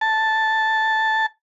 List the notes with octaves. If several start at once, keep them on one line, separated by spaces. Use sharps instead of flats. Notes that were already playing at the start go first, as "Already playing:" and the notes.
A5